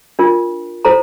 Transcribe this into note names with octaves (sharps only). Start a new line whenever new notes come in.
D4 F4 A#4
E4 A4 C5 A#5